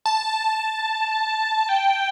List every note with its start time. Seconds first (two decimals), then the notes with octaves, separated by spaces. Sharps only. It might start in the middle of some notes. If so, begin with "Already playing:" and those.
0.06 A5
1.69 G5